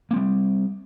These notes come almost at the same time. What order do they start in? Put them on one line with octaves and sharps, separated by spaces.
A#3 C4 G3